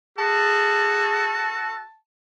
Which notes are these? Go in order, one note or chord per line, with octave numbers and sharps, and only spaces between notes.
F#4 G#4 A4 A5